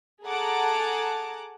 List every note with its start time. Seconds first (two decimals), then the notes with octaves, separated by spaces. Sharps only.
0.24 G#4 A4 F#5 A5 A#5 D6